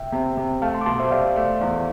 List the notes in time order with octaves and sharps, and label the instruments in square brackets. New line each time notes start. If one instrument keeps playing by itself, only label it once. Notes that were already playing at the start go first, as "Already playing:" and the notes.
Already playing: [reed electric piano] E5 G5
[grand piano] C3
C3
[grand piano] A3 [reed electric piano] F5 A5
[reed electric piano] A5 C6
D6
[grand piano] B2 [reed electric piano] A5 C6
[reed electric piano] C5 E5
[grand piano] G4 [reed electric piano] D5 F5
[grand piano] A3
E2